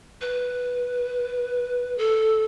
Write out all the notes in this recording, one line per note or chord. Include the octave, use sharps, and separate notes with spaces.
B4
A4